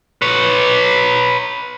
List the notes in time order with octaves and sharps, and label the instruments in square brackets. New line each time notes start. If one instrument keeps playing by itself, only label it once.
[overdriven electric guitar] B4 C#5